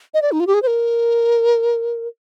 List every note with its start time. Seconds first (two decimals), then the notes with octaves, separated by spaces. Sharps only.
0.14 D#5
0.22 D5
0.32 D#4
0.40 F4
0.47 G4
0.54 G#4
0.62 C5
0.67 A#4